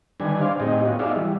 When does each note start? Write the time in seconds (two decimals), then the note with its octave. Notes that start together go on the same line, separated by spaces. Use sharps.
0.20 D3 D#3 G3 D4 B4 G#5
0.41 C5 D5 F5
0.60 A2 C4 D#4 G4 G#4 D#5
0.85 B3 C#4 F4 F#4
0.99 D#4 F#4 G#4 D5 E5 F5
1.15 E3 G3